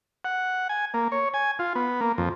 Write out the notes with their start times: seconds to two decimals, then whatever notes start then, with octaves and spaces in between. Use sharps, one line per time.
0.25 F#5
0.69 G#5
0.94 A#3
1.12 C#5
1.34 G#5
1.59 F4
1.75 B3
2.01 A#3
2.18 F2